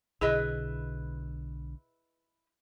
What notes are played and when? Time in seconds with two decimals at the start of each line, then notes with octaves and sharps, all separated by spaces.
0.21 B1 B2 D3 E4 G#4 B4 D#5